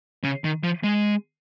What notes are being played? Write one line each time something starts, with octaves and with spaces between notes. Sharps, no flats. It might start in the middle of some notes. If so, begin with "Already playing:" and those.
C#3
D#3
F3
G#3